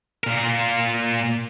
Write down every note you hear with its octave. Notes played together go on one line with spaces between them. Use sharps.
A#2 A#4